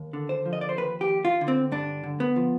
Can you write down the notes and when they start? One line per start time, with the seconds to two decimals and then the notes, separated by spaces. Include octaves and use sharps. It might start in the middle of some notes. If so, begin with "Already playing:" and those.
Already playing: D#2
0.13 D3
0.29 C5
0.46 F3
0.53 D#5
0.61 D5
0.69 C5
0.77 D#2 B4
1.01 G4
1.08 D#2
1.25 F4
1.41 D3
1.48 C4
1.72 G2 D4
2.04 D3
2.20 B3
2.36 F3